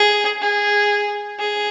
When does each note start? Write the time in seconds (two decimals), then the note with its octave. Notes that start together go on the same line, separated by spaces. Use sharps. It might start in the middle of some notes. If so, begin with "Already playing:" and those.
Already playing: G#4
0.41 G#4
1.39 G#4